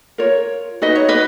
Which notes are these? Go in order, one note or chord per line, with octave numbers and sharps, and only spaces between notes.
F4 A#4 C#5
D#4 F#4 B4 D#5
C#5
B4 D#5